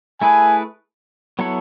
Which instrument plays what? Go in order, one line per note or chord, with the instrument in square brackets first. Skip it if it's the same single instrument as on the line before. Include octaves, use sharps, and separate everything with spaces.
[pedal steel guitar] A3 E4 G#4 B4 [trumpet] G#5
[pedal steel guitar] F#3 B3 E4 A4 C#5